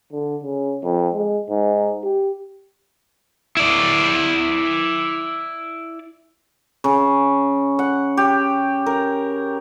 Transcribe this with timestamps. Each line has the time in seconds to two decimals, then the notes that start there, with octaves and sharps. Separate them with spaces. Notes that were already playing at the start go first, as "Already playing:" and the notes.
0.12 D3
0.43 C#3
0.83 F2
1.14 G#3
1.49 G#2
2.04 G4
3.57 E4 D5
6.84 C#3
7.79 F#5
8.17 G4
8.86 A#4